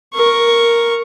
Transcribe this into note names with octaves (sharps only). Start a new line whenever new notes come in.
A#4 C#6